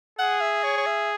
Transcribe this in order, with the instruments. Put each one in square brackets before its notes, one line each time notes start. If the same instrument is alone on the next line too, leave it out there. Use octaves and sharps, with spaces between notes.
[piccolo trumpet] G#4 [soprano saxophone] F#5
[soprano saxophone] E5
C#5
C#5
E5